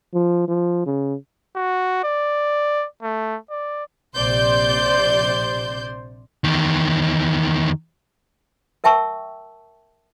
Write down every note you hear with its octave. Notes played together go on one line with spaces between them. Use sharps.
F3
F3
C#3
F#4
D5
A3
D5
A#1 C3 C5 D5 C6 G6
E2 D#3
A#4 E5 G5 A5 C#6 E6